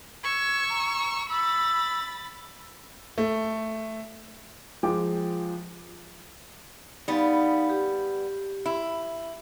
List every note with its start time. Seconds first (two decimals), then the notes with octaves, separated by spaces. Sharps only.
0.24 C#6 E6 G#6
0.70 A#5
1.30 B5 E6 A6
3.18 A3
4.83 F3 G#3 G5 D6
7.08 G3 B3 D#4 F5
7.70 G4
8.66 E4